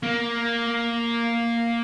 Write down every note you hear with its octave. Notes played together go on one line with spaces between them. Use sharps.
A#3